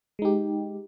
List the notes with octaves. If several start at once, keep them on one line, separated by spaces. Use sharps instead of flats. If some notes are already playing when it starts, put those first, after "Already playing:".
G#3 D#4 G4